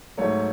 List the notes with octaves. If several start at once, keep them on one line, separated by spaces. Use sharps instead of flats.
G#2 F#3 A3 C#5